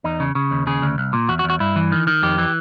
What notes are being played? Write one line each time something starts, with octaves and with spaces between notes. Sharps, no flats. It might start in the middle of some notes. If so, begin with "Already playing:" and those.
E2 D#4
C#3
C#3
D#2
C#3 G#4
D2
C2
A#2
E2 F#4
F#4
E2
F#4
G2 E4
E3
D#3
D#3
F2 G4
E3